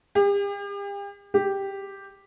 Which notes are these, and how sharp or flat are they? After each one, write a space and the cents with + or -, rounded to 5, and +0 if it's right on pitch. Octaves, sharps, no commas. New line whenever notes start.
G4 +40
G4 +0